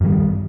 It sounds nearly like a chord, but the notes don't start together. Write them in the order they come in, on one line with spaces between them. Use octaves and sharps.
G2 E3 G3 D#3